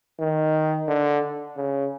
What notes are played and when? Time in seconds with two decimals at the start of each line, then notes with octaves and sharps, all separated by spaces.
0.19 D#3
0.88 D3
1.56 C#3